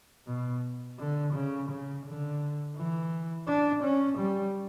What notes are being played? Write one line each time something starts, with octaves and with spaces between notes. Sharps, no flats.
B2
D3
C#3
C#3
D3
E3
D4
C#4
G3